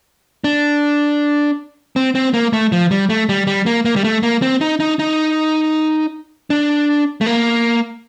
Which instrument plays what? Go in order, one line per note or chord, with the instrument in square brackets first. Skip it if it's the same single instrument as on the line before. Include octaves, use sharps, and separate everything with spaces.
[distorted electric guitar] D4
C4
C4
A#3
A3
F3
G3
A3
G3
G3
A#3
A#3
G3
A3
A#3
C4
D#4
D#4
D#4
D4
A3
A#3